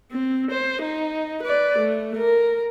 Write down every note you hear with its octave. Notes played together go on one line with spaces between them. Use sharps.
C4
C5
D#4
B4 D5
A3
A#4